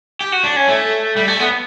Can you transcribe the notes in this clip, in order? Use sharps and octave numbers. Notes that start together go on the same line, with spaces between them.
G4
F#4
D4
C#4
A3
G3
A3
B3